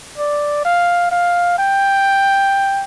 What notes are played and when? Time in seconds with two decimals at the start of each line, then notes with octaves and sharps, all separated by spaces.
0.18 D5
0.65 F5
1.12 F5
1.59 G5